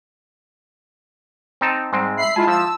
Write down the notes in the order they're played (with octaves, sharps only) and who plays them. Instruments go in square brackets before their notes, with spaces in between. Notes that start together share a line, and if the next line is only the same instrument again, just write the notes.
[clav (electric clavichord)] C4 D#4 A5
[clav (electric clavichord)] G#2 G#3 C4 [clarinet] G3
[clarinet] E5 [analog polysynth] B5 C7
[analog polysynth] G#3 E4 F4 [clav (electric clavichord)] G#5 [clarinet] A5
[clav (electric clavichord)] F3 [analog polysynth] E6